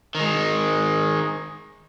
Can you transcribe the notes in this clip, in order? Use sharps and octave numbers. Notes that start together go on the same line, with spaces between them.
D#3 G#3